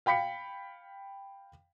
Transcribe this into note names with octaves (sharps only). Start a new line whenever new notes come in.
F5 G5 B5 B6 C#7